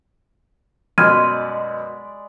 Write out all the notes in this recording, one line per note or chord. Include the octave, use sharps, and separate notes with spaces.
F#2 B2 G#3 D5 B5 F6 G#6 D#7